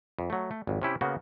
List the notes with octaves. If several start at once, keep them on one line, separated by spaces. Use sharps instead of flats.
F2
F#3 A3
A3
G#1 F2
C3 C#4 E4 G4
C#3 A#3 B3 F#4